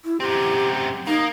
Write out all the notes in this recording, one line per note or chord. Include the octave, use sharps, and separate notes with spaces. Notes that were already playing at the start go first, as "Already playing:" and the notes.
E4
F#2 C4 G4
A#3 D#4